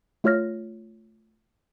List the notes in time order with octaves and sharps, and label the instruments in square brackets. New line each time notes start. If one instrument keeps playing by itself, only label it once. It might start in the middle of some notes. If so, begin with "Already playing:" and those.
[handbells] A3 F4 C#5 F6 A#6